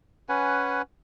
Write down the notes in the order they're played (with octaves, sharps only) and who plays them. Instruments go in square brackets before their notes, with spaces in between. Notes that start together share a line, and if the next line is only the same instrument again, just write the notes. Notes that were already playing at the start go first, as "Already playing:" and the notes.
[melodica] C#4 B4 F#5 G#5